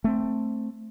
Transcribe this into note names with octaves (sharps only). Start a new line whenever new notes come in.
A3 C4